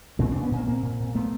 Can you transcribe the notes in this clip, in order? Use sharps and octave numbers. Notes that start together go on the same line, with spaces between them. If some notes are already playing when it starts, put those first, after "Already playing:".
A#2 C4 D4
A#2 C4 D4
B3 C#4
A#2 A#3 C4
A#2 A#3 C4
A#2
A#2
A#2 A3 B3